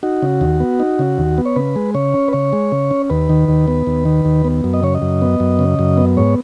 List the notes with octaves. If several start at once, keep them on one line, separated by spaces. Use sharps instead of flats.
D#4 F#4
C#3
D#2
B3
D#4
C#3
D#2
B3
C#5
C#3 B4
G#3
C#3 C#5
C#4
B4
C#3 C#5
G#3
C#3
C#4
D#2 B4
D#3
D#2
B3
D#2
D#3
D#2
B3
F#2
D#5
C#3 C#5
D#5
F#2
B3
F#2
C#3
F#2
B3
G#2 C#5